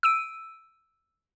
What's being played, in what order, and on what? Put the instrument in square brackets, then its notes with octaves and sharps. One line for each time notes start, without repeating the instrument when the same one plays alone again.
[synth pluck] E6 D7 D#7